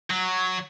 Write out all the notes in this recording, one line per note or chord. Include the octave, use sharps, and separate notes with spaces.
F#3